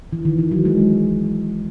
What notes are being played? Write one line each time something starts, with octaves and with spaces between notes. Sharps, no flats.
E3
D#3
E3
F#3
G#3